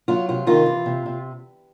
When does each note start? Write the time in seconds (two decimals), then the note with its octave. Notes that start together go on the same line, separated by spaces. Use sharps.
0.08 F#3 F4
0.28 C3 F4
0.47 D#3 F4
0.66 E3
0.86 C3
1.06 C3